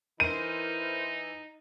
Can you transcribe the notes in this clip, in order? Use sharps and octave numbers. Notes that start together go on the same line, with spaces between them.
E3 D#4 E4 A#4 C5 D#7